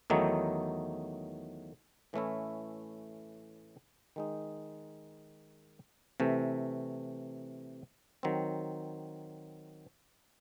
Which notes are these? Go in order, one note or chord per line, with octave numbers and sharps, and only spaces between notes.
E2 D#3 F#3 A3 D#4
A2 E3 A3 C#4 E4
D#3 G#3 D#4
C3 E3 A3
D#3 F#3 C4